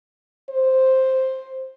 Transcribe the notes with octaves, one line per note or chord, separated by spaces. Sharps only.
C5